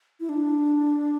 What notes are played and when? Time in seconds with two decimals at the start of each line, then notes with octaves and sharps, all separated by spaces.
0.20 E4
0.29 D4